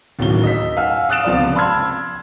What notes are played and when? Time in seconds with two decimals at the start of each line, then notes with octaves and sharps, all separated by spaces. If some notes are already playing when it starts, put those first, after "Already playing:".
0.19 D1 D#2 F#3 C#4 G7
0.43 D#5 E6 B6
0.77 F5 F#5 G#5 E6 F6
1.09 F5 D#6 F#6 A6 D7 E7
1.25 C#2 C3 F3 B3 D5
1.55 A5 B5 C6 E6 F6 G#6